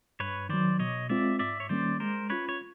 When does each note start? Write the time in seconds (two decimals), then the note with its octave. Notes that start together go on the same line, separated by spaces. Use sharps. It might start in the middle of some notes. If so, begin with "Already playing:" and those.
0.20 G2 B4 C#5
0.49 D#3 F#3 C5 D5
0.79 B2 C#5 D#5
1.09 G#3 C4 F4 D5 E5
1.39 G#2 D5 E5
1.60 C#5
1.69 D#3 G3 A#3 C#4 C5 D5
2.00 G#3 A#4 C5
2.30 C#4 F4 B4 C#5
2.49 C#5